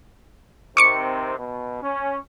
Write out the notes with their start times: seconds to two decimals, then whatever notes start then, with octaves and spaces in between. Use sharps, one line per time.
0.77 C3 D#3 C4 C#6 D6 C#7
1.38 B2
1.83 C#4